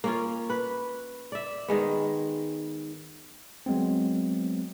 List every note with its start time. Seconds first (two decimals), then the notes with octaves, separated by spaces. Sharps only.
0.04 A#3 C#4 F4
0.50 B4
1.32 D5 E5
1.68 D#3 G#3 B3
3.66 F#3 G#3 B3 C4